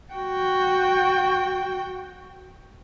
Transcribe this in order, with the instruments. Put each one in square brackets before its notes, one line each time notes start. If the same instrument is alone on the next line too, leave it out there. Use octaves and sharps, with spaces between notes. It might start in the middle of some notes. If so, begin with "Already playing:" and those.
[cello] F#4 G5